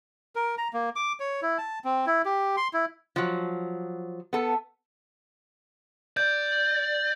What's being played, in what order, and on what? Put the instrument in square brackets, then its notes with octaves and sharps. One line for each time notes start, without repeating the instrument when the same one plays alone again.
[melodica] A#4
A#5
A#3
D6
C#5
E4
A5
C4
E4
G4
C6
E4
[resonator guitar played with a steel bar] F3 F#3
B3 A4
[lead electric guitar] D5 [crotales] G6